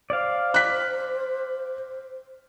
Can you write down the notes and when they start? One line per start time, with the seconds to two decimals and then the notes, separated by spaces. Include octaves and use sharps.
0.10 C5 D5 F5
0.54 F#6 B6